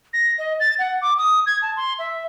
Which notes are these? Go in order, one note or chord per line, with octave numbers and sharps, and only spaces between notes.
A#6
D#5
A6
F#5
D6
D#6
G#6
A5
C6
E5